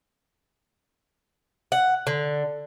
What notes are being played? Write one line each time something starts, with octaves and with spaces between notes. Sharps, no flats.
F#5
D3